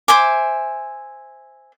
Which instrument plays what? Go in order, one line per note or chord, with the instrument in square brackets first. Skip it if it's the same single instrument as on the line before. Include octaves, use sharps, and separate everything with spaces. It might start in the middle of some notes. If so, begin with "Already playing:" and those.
[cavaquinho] C5 E5 G#5 D6